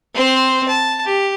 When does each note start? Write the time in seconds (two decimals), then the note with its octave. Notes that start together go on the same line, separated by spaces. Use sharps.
0.15 C4 C5
0.69 A5
1.05 G4